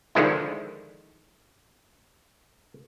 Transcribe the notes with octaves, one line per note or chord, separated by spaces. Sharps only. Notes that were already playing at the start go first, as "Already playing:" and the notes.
D3 D#3 F3 G#3 E4